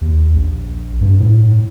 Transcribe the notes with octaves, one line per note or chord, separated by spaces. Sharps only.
D#2
A#1
G2
A2